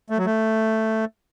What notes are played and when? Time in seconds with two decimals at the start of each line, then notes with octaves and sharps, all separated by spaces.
0.10 A3
0.18 F#3
0.26 A3